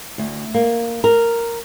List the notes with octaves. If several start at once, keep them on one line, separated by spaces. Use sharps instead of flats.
D2
A#3
A#4